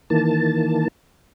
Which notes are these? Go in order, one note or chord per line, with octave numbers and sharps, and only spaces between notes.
D#3 E3 A#3 A5